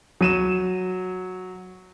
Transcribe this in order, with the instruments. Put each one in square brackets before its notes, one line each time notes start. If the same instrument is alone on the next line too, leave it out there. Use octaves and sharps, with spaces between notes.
[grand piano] F#3 D#7 E7